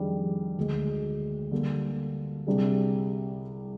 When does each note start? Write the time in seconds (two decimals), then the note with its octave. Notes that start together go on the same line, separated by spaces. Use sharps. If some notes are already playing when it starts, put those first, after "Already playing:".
Already playing: F2 D#3 G3 D4 G#4
0.57 D2 D3 G#3
1.51 D3 G3 A#3
2.47 C2 C3 G3 D4 G#4